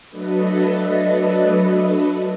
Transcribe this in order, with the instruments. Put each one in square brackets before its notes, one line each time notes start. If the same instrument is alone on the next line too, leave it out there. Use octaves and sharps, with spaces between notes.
[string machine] F#3 A3 D4 A4 B4 D#5